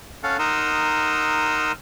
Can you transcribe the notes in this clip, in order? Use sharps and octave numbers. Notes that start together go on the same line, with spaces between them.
C#4 A4 F5 F#5
D#4 A#4 F#5 C6 D#6 E6